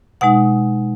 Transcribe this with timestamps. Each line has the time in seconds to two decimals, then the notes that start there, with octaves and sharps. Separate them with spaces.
0.21 B2 G#3 D#4 F#5